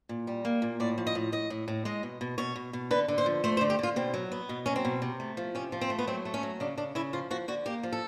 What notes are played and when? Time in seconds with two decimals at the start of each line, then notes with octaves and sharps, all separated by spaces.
0.09 A#2
0.27 G3
0.45 A#3
0.62 A#2
0.80 A2 D5
0.98 F3
1.07 D#5
1.15 A2
1.32 A2 D#5
1.50 A2
1.68 A2
1.85 G#3 D#5
2.03 B2
2.21 B2
2.38 B2 C#5
2.56 B2
2.73 B2
2.91 D3 B4
3.08 D3
3.18 C5
3.26 F3
3.44 A3 C5
3.57 C5
3.61 D3
3.70 G4
3.79 D3 F4
3.96 B2 C4
4.14 F#3
4.32 B3
4.49 B2
4.66 F#3 C#4
4.76 C4
4.85 B2
5.02 C3
5.20 A3
5.37 F3
5.55 C3 C#4
5.72 F3
5.81 C4
5.90 A3
5.99 B3
6.07 F#3 C4
6.25 A3
6.34 C#4
6.43 F#3
6.60 C#3 D4
6.77 C#3 D4
6.95 C#3 E4
7.13 F3 F4
7.30 F3 F#4
7.48 D3 F#4
7.66 A#3 G4
7.83 F3
7.92 A4